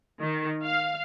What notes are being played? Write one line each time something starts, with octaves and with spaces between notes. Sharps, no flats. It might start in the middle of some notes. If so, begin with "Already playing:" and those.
D#3
F5